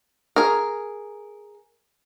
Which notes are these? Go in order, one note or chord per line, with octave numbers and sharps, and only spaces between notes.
G#4 A#4